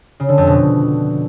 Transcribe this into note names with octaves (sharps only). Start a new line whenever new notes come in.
C#3
D3
F2
B2